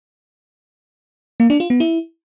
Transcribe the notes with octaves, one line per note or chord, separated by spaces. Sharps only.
A#3
D4
F4
B3
E4